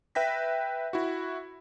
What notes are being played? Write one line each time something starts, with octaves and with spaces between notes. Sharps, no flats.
B4 E5 G5 A#6 B6
E4 F#4